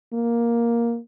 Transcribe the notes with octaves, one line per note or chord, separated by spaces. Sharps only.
A#3